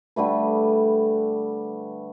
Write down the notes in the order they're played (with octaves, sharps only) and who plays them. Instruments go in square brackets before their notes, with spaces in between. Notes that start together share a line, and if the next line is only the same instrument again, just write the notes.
[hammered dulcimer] D3 G3 A3 B4